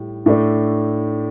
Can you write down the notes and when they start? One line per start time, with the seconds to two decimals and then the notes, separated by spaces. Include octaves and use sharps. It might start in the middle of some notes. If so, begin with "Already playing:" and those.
Already playing: A2 G3
0.26 A2 A3 D4